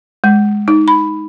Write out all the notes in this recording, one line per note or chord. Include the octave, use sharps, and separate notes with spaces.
G#3
D#4
B5